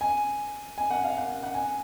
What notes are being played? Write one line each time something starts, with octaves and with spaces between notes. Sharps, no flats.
G#5
G#5
F#5
F5
F#5
F#5
G#5